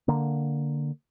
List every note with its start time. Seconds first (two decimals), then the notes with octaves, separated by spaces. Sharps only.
0.08 D3 A#3